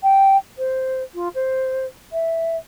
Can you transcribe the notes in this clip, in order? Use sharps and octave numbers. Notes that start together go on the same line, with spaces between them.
G5
C5
F4
C5
E5